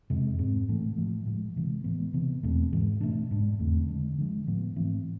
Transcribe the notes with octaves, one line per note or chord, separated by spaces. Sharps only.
F2 C3 G#3
G#2 G#3 C4
A2 E3 A3
A2 F3 A3
A2 F3 G#3
C3 E3 G#3
A2 E3 G#3 B3
C3 E3 B3
E2 B2 A3 C4
G#2 E3 G#3
B2 A3 D4
G#2 G#3 D4
E2 D3 A3 C4
D3 G#3 D4
D3 F3 G#3
A2 F3 B3
G#2 E3 A3 C4